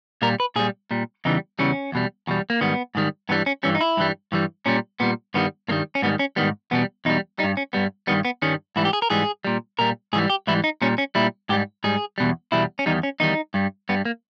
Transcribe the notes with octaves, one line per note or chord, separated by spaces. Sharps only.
A#2 G3 A#4
B4
A#2 G3 G#4
A#2 G3
E2 C#3 E3 G3 D#4
E2 C#3 E3 G3 C#4
E2 B2 G3
E2 B2 G3
A#3
G#2 D#3 G3 B3
G#2 D#3 G3
G2 E3 G3 B3
C#4
G2 E3 G3 C#4
D#4
E4
G2 E3 G3
G2 E3 G3
A#2 G3 C#4
A#2 G3 B3
G2 D#3 G3 B3
G2 D#3 G3 A#3
C#4
G#2 D#3 G3 B3
C#4
G#2 D#3 G3 B3
E2 B2 G3 B3
E2 B2 G3 D#4
G2 G3 D#4
C#4
G2 G3 B3
G2 D#3 G3 B3
B3
G2 D#3 G3 C#4
G#2 E3 G3 E4
G4
G#4
A#4
G#2 E3 G3 G#4
A#2 G3
A#2 G3 A#4
G#2 E3 G3 G#4
G4
G#2 E3 G3 E4
D#4
A#2 G3 C#4
C#4
A#2 G3 E4
G#2 G3 G4
G#2 G3 G#4
E2 B2 G3
E2 B2 G3 E4
C#4
E2 D#3 G3 D#4
C#4
E2 D#3 G3 D#4
G2 G3
G2 G3 B3
A#3